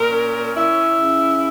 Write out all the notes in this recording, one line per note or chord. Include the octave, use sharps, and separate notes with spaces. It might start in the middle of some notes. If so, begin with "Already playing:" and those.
Already playing: A#2 A#4
C#4
E4
C#3